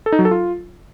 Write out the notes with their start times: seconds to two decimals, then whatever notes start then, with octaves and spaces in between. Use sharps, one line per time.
0.06 A4
0.12 D#4
0.19 F#3
0.25 A4
0.31 F4